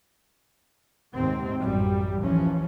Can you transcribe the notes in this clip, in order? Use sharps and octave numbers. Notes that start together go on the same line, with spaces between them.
D#2 G#2 C3 D#3 C4
A1 F#2 G3
D#2 E3 F3 C#4